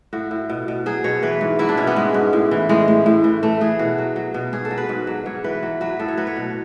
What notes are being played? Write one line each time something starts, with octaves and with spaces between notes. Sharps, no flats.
A2 F#4
A2
B2
B2
F#3 G#4
B2 C#5
E3 B4
G#2
F#3 E4
D4
B2 C#4
B3
G#2 G#3
G#2
A2
E3
A2 G#3
A2
A2
E3
E3 A3
E3 G#4
B2 F#4
F#3
F#3
B2
G#2 G#4
A4
F#3
B4
G#2
F#3
G#2 C#5
E3 B4
F#3
F#3 B4
A2 A4
C#5
F#3 B4
C#5
B2